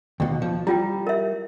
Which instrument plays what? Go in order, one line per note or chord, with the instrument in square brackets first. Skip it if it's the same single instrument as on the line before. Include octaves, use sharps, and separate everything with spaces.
[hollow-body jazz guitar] D#2 B2
F3
[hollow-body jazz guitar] G3 [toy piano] E4 F4 G5
[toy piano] A#4 E5